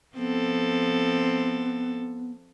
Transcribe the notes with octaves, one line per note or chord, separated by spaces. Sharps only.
F3 B3 C4 A4